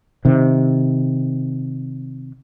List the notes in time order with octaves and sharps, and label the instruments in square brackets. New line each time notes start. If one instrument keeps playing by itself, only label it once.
[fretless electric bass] C3 D#3